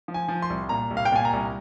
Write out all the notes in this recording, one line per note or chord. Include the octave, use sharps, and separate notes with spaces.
F3
G#5
F3
C6
C2
A#2 A#5
C2
F5
G5
A#2 G#5
A#5
C2